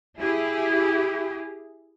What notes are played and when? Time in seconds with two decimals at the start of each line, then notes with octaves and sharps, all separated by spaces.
0.19 E4 G4 G#4